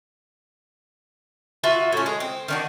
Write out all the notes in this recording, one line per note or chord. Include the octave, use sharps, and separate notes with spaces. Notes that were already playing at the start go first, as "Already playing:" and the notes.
F4 F#4 B4 E5
A2 C#4
G#3
C4
D#3 D4 F#4